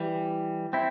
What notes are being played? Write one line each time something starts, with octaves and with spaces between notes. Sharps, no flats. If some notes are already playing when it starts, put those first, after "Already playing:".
Already playing: E3 G3
C4 E4